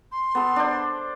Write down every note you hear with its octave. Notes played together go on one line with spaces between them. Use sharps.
C6
B3 A4
D4 C5